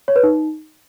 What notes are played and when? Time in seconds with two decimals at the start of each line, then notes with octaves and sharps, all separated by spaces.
0.08 C#5
0.16 B4
0.23 D#4